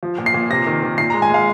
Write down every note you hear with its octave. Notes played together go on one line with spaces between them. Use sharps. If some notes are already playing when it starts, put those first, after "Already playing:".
F3
A#2
C7
A#2
C3 A#6
D#3
D#3
A#2 C7
G#3 A#5
G#5
G#3 F5